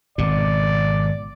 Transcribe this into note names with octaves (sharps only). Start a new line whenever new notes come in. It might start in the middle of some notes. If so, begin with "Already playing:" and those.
G#1 B2 D5